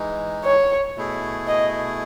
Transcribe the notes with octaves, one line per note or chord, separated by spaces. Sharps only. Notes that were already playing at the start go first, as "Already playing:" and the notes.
Already playing: E3 G#3 D#4
C#5
B2 A3 E4 G#4
D#5